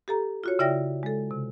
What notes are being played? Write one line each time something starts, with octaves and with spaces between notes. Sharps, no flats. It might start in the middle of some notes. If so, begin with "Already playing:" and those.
G4 A4 A#5
F4 F#4 C#5
C#3 E4 D5 E5 G5 A#6
G#3 A4
C3